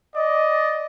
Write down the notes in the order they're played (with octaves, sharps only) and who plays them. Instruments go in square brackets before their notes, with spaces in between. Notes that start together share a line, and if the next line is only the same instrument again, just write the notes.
[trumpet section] D5 D#5